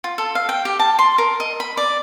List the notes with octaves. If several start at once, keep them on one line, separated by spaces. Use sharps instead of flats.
F4
A4
F5
G5
G4
A5
C6
A#4
D#5
B5
D5